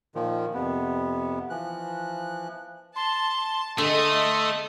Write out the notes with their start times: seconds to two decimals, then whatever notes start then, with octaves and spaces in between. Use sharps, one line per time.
0.15 A#2 D#3 F3
0.54 F2 C3 B3
1.50 E3 F3 F#6
2.95 A5 C6
3.78 D3 A3 D#5 E5 G#5 C6 D#6